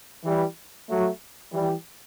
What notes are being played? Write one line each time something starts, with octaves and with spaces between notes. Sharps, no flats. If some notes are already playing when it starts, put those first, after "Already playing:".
E3 G3
F#3 A3
E3 G3